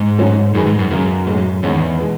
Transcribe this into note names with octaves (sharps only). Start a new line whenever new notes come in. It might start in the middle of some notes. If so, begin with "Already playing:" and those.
Already playing: G#2
A2 F#3 C#4 F#4
F#2 D#3 G#3 D#4 G#4 B4
G#2
F#2
C#2 F#2 C#3 G#3
B1 A2 G#3
G#1 E2 G#2 D#3 G#3 C#4
B2 G#3 B3